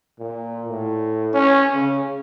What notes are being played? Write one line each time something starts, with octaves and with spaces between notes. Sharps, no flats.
A#2
A2
C#4
C#3